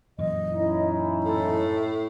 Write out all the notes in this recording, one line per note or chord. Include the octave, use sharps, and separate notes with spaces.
F#2 A#2 E3 D#5
C#4 D#4 E4
A2 A4